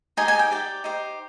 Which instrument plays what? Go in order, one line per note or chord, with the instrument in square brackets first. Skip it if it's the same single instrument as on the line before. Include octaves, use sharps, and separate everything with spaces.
[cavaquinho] D#4 G4 C5 D#5 G#5
G#5
G5
G4 D5 G5
D#4 G4 C5